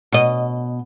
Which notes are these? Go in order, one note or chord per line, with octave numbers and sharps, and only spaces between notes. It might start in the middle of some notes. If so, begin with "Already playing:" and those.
B2 D#5